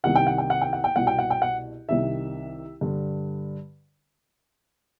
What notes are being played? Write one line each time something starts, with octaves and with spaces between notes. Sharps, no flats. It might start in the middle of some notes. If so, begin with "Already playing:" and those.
C2 C3 D#3 F#5
G5
F#5
G5
F#5
G5
F#5
G5
C2 B2 F#5
G5
F#5
G5
F#5
C2 C3 D#3 E5
G2 D3